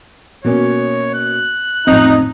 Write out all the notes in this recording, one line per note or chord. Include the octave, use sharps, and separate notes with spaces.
B2 A#3 C#4 C#5
F#6
A1 F2 C4 D#4